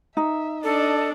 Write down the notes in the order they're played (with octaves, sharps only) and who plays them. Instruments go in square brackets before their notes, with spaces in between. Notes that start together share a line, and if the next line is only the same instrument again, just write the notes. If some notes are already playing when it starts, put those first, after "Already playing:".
[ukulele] D#4 [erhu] E5
[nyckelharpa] D4 [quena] A4 [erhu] D#5